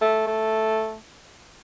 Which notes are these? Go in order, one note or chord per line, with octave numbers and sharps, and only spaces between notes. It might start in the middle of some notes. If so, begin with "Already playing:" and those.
A3
A3